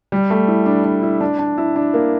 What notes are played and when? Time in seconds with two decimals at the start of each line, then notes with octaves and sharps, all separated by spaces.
0.12 G3
0.30 A3
0.48 E4
0.66 D4
0.84 D4
1.03 E4
1.21 D4
1.39 D4
1.58 E4
1.76 D4
1.94 A#3